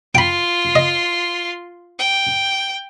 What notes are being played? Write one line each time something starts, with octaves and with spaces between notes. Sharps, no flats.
F4 G5 B5 C6
D#5
G5